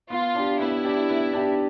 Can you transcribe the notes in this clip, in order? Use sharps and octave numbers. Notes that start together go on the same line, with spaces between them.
B3 F4
D4 G4
B3 E4
D4 G4
B3
D4 G4